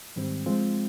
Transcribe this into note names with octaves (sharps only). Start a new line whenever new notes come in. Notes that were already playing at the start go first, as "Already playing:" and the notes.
G#2 D#3 G3 C4
F3 G#3 C4 F4